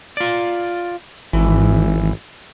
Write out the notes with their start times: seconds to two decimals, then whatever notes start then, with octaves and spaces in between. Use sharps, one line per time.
0.17 F4 D5
1.33 G#1 E3